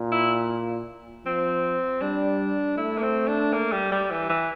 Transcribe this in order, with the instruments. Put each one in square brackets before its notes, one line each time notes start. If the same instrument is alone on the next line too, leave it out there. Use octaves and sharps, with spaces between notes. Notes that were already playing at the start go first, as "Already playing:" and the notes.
Already playing: [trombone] A#2
[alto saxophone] E4
[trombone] F3 [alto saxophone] C4
[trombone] G3 [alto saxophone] D4
[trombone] A3 [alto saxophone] E4
[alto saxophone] A#3
C4
D4
A#3
G3
G3
E3
E3